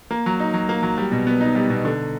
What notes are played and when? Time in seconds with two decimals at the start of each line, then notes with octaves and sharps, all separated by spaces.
0.11 A#3
0.26 F#3
0.40 D#4
0.54 F#3
0.69 A#3
0.83 F#3
0.98 G3
1.12 B2
1.27 B3
1.41 D#4
1.55 G3
1.70 B2
1.85 D3